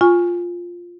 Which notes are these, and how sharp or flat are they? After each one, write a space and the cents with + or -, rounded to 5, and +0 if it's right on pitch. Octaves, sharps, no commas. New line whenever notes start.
F4 +0 G#5 -10 C#6 +0